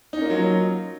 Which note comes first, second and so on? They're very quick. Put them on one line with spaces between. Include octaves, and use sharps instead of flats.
D#4 C#4 A#3 F4 F#3